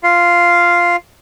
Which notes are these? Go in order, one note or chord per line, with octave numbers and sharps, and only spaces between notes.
F4 F5